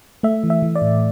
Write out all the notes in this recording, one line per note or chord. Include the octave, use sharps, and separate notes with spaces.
A3 E5
E3
E5
E3
D5
A2